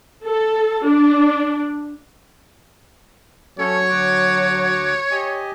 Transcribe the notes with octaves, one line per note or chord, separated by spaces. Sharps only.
A4
D4
F#3 A3 C#4 A4 C#5
D2 F#4 D6
G4 D#5 G#5